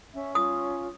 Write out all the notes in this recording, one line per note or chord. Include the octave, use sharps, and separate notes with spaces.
C#4 E5
F4 D#6